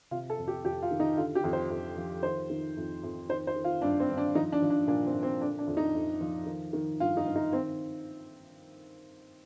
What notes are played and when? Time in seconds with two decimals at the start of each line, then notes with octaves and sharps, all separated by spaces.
0.11 C3 F4
0.30 A4
0.38 F2
0.48 G4
0.65 F2 G4
0.82 F4
0.91 D#3
1.00 D#4
1.17 D3 F4
1.35 G4
1.44 F2
1.53 C5
1.70 F2
1.97 F3
2.23 D#3 C5
2.50 D#3
2.77 F2
3.03 F2
3.29 D#3 C5
3.47 C5
3.56 D#3
3.64 F4
3.82 G2 D4
4.00 C4
4.09 G2
4.17 D4
4.35 F3 D#4
4.52 D4
4.62 F3
4.70 D4
4.87 A#2 D4
5.06 C4
5.14 A#2
5.23 C4
5.41 D3 D4
5.58 D4
5.67 F2
5.77 D#4
5.94 F2
6.21 F3
6.46 D#3
6.73 D#3
7.00 G2 F4
7.17 D#4
7.26 G2
7.36 D#4
7.52 D#3 C4